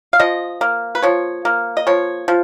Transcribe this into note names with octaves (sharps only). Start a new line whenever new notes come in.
F5
F3 D#5
A#3
B4
F3 C#5
A#3
D#5
F3 C#5
F3